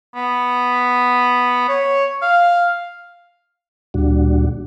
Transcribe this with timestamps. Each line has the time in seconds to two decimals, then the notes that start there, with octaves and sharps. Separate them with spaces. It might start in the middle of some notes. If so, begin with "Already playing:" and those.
0.15 B3
1.69 C#5
2.22 F5
3.94 D2 A#2 G3 D4 F#4